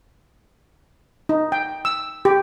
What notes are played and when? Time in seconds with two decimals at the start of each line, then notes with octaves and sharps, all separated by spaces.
1.29 D#4
1.52 G5
1.85 E6
2.25 G4